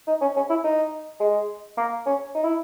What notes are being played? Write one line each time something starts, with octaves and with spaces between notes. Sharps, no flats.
D#4
C#4
C#4
E4
D#4
G#3
A#3
C#4
D#4
E4